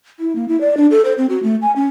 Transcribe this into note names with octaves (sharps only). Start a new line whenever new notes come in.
E4
A#3
E4
D5
D4
A4
C5
C4
F#4
A3
G#5
C#4